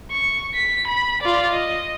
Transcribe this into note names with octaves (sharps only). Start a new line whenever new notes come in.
C#6
B6
B5
F4 D5
D#5